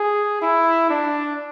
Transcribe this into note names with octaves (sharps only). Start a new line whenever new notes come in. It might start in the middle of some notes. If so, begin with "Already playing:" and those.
Already playing: G#4
E4
D4